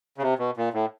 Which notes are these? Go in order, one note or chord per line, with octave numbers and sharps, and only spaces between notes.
C#3
C3
B2
A#2
A2